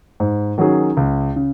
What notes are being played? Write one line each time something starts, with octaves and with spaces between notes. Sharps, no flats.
G#2
D#3 F#3 C#4 G#4
C#2
C#3